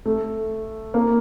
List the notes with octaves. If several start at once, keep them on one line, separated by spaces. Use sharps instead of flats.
A3
A#3